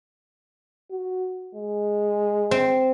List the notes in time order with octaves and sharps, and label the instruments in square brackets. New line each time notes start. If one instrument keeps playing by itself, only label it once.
[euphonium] F#4
G#3
[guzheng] C4